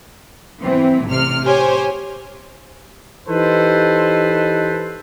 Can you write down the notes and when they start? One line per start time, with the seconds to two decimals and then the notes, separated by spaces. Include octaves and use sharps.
0.62 E3 C4
1.06 A1 C3 F6
1.45 G4 C5 C#5 G#5
3.27 E3 D#4 G4 A4 B4 C5